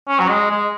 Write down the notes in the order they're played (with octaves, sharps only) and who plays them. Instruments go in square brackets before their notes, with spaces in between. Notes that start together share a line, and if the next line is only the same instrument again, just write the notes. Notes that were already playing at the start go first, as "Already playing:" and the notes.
[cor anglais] C#4
F#3
G#3
G#3